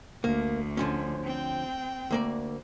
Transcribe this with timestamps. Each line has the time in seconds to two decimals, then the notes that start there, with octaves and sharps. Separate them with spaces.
0.24 D2 A#3
0.77 D3 F3 C#4
1.23 C4 G5
2.11 D2 A#3 D5